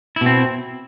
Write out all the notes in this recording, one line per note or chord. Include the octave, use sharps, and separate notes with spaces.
B2 C4 E4